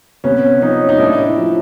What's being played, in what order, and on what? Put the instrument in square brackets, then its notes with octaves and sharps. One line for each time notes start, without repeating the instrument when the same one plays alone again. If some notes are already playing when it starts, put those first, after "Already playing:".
[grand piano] C3 B3 C#4
F3 C#4 D#4
D#4
A2 D4 E4
F3